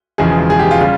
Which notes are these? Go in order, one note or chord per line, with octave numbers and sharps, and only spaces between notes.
E1 E2 C#3 F3 G#3 G#4
G#4
G4
F4
C#3 G3 F4